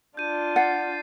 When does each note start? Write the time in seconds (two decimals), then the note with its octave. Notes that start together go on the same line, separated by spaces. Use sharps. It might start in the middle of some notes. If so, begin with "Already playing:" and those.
0.17 D4 F4 G6 D#7
0.56 F#5 A6 C7